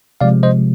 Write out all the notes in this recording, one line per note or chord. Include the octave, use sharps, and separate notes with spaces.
C3 F3 G#3 D5 F5
C5 D#5